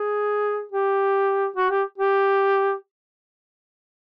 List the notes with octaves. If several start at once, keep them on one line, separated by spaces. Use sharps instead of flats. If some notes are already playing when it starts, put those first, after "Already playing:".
Already playing: G#4
G4
F#4
G4
G4